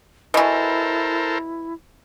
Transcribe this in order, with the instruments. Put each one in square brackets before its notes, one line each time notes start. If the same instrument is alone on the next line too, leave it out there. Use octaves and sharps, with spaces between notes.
[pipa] B2 E3 [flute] E4 [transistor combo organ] A4 A#4 C5